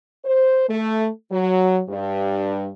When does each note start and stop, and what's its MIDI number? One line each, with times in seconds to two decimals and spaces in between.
0.25 0.66 72
0.69 1.09 57
1.32 1.81 54
1.89 2.69 43